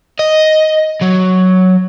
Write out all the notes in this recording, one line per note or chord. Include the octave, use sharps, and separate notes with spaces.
D#5
F#3